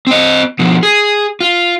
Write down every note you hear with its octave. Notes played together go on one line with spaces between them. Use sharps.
C4 D#5
B2 F3
G#4
F4